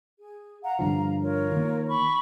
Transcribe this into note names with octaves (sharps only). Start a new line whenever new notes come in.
G#4
F5 F#5 A#5
G2 D3 F3 F5 A#5
F4 A#4 C#5
D#3 A#3
B5 C#6